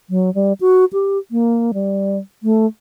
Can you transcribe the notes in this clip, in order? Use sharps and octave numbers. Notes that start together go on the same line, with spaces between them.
F#3
G3
F#4
G4
A#3
G3
A3